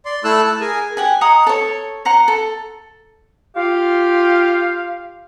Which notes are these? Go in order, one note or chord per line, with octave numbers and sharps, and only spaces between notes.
D5 C6
A3 E4 A4 E6 F#6
A5
G#4 A#4 G#5
G4 F#5 G#5
D#5 F#5 A#5 D#6
A4 C#5
F#5 A#5 C6
A4
F4 G4 F5